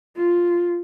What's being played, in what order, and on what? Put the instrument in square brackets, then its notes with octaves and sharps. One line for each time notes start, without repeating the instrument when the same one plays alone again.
[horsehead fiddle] F4